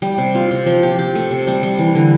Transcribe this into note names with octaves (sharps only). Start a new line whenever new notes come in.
G3
C3
F4
C3
F3
G4
G4
A3
C3
G3
G3
E3
D3